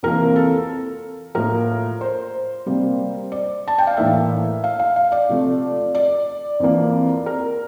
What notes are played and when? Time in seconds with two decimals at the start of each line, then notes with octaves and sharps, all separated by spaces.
0.03 F2 C3 E3 A#3 A#4
0.36 A4
1.35 A2 F3 A#3 A#4
2.01 C5
2.66 C3 G3 A#3
3.32 D5
3.68 A5
3.78 G5
3.87 F5
3.97 A2 E3 A#3 E5
4.64 F5
4.79 F5
4.96 F5
5.12 D5
5.29 C3 F3 A3
5.95 D5
6.60 F2 E3 A#3
7.26 A#4